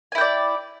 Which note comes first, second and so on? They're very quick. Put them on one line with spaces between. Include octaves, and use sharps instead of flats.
G#5 E4 G5 D5